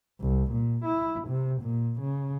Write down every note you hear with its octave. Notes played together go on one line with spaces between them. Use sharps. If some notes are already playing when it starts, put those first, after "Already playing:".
C2
A#2
E4
C3
A#2
C#3